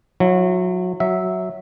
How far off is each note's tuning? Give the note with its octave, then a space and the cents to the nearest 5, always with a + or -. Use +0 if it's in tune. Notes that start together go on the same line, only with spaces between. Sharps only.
F#3 -25 E4 +10
F#3 +0 E5 -10